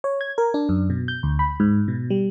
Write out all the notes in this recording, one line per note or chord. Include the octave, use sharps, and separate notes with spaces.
C#5
G#6
A#4
D4
F#2
B2
G6
D2
B5
G#2
B2
G3